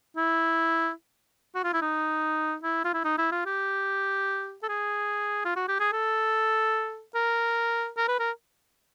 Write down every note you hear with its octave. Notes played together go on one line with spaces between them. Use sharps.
E4
F#4
F4
E4
D#4
E4
F4
E4
D#4
E4
F4
G4
A4
G#4
F4
F#4
G4
G#4
A4
A#4
A#4
B4
A#4